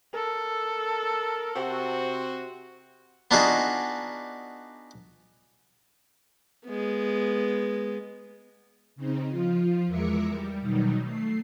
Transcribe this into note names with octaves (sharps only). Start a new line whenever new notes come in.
A4 A#4
C3 C4 F#4
B3 D4 D#4 F4 F#4 G#4
G#3 B3
C#3 C4 D#4
F3 F4
E2 G#3 A#4 E5 D6 C#7
G3
B2 D#3 F#3 G3 D#4
A3 C7